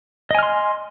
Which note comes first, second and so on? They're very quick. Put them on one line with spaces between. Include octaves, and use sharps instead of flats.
D#5 G#5 F6 C6